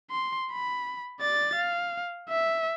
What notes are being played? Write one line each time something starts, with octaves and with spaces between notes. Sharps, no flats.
C6
B5
D5 A6
F5
E5